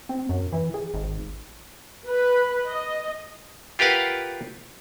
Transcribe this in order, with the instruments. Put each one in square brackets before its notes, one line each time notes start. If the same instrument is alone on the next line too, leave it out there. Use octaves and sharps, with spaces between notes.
[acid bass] C4
F#2
E3
G#4
G#1
[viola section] B4
D#5
[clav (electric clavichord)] F4 G4 A#4 B4 F5 F#5